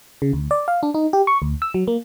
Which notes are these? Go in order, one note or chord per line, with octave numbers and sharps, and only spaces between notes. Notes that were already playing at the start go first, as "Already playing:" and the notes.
C#3
D2
D5
F5
D4
D#4
G4
C#6
D2
E6
F#3
A#3